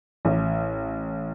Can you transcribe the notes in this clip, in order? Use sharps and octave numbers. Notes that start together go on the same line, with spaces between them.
A1